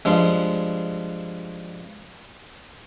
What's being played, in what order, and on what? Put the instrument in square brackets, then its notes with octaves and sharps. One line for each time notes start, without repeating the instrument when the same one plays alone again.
[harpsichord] G2 F3 G#3